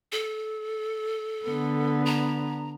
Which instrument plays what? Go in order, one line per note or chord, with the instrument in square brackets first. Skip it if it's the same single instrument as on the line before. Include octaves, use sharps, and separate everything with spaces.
[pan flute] A4
[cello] D3 B3
[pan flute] A#5